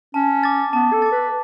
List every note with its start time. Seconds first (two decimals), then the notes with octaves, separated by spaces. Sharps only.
0.14 C#4 A5
0.43 D6 A6
0.73 B3 A5
0.93 A4
1.02 D6 A6
1.12 B4